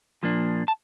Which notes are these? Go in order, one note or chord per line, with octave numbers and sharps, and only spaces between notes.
A#2 F3 A#3 D4
A5